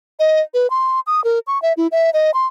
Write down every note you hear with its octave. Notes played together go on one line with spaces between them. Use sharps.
D#5
B4
C6
D#6
A#4
C#6
E5
E4
E5
D#5
C6